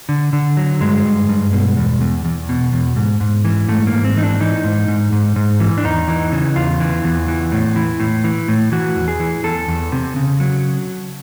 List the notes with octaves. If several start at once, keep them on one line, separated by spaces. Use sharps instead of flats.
D3
D3
F#3
G2 G#3
G2
G2
B2
E2
E2
E2
B2
E2
G#2
G#2
E3
G#2 A3
A#3
G#2
C4
E3 D#4
D4
E3 D#4
G#2
G#2
G#2
G#2
E3
D4
E2 D#4
E3
C#3
E2 F4
E3
E2
E3
A2
E3
A2
E3
A2
E3 F#4
E2
G#4
E3
E2 A4
E2
C3
C#3
F#3